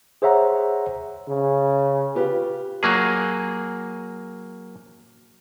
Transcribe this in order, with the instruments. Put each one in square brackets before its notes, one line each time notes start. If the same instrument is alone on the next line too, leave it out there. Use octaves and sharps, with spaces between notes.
[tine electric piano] G#4 C5 C#5 E5 F#5 A#5
[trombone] C#3
[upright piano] F4 G4 B4
[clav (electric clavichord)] F#3 A#3 G#4